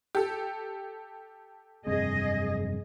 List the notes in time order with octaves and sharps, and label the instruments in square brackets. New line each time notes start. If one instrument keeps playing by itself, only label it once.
[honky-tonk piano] G4 A4
[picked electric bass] F1 G2 C4 [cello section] G#4 D#5